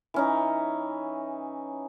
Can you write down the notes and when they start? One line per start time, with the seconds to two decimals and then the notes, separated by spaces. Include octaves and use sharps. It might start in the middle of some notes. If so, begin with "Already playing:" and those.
0.14 E3 C#4 D#4